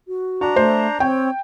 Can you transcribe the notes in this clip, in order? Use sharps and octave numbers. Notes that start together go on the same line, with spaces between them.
F#4
D4 F#4 A#5
A3 C5
C4 C#5 G5